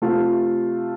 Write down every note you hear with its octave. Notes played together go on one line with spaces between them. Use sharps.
C3 A3 F4